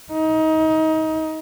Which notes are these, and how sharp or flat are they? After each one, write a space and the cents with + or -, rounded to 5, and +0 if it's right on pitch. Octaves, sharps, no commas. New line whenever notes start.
D#4 +25